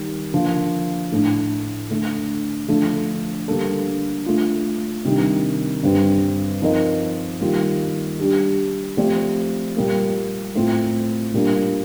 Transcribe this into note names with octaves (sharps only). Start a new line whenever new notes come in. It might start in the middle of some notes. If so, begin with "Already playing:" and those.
Already playing: D#3 G3 G4
D3 F3 A#3
A2 A3 D4
D3 A3 D4
D3 F3 A3 D4 A4
D3 G3 A#3 D4 A4
A3 D4 F4
C3 D#3 G3 D4
G2 D3 G3 C4
F3 C4 D#4 A#4 D#5
D#3 G3 A#3 F4
G3 D4 G4
F3 A3 C4 G4 D5
A#2 G3 A#3
A2 A3 C4 F4
A#2 G3 A#3 D4